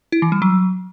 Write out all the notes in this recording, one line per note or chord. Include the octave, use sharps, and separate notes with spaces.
E4
E3
G3
F#3